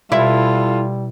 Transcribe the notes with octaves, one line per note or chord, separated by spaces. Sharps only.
B2 G3 E4 F4 A4